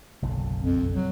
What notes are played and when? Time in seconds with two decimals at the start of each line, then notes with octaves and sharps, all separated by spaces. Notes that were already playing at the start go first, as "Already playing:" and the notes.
0.22 F#1 B1 D3
0.62 F2
0.94 F#3